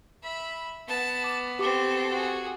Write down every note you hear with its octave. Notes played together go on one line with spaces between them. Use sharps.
E5 B5
B3 A5
D6
C4 G4 A4 D6
F#4 G#4